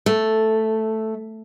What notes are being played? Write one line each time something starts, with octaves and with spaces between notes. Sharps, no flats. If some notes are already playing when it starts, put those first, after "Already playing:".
A3